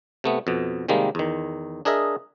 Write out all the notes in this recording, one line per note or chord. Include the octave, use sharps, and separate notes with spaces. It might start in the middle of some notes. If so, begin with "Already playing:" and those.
C3 A3 B3
F2 B2
C3 D#3 G3 G#3 A#3
E2 D#3
D4 G#4 A#4 D#5 E5